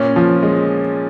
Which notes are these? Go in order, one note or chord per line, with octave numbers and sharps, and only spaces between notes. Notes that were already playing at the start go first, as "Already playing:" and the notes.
Already playing: A#2 C#4
F3
G#3